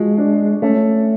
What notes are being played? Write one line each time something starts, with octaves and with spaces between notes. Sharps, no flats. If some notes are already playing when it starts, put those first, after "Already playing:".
Already playing: F3 G#3 F#4
D4
A3 C#4